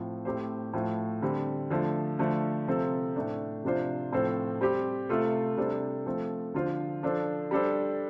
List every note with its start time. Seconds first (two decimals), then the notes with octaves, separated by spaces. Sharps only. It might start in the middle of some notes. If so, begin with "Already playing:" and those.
Already playing: A2 F3 C4
0.25 A2 A3 C4 G4 C5
0.73 A2 F3 A3
1.22 D3 G3 C4
1.70 D3 F3 A3
2.19 D3 F3 A3
2.67 C3 F3 C4 A4
3.16 A2 A3 D4
3.64 C3 F3 D4 F4 C5
4.12 A2 F3 C4 A4 C5
4.61 G3 C4 G4
5.09 C3 A3 F4 A4
5.57 C3 G3 D4 A4 C5
6.06 F3 A3 C4 A4
6.54 D3 F3 D4 F4 C5
7.03 F3 D4 A4 C5
7.51 G3 D4 A4 C5